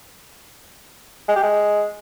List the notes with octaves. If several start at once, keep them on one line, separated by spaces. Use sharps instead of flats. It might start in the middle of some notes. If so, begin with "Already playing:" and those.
G#3
G4
G#3